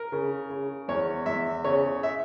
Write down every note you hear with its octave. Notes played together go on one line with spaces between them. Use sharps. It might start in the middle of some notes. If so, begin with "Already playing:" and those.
Already playing: A#4
C#3
C#3
E2 C#5
E2 E5
C#3 C#5
E5